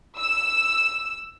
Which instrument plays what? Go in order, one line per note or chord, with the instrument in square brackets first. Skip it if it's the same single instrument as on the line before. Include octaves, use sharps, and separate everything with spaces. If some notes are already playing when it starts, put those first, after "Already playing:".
[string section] E6